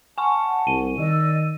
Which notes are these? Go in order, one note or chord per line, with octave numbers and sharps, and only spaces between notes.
F#5 G#5 A5 C#6
C2 D#7
D#3 D5 D#5 E6